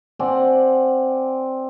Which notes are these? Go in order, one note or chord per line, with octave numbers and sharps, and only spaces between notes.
C4 D5 F#5 G#5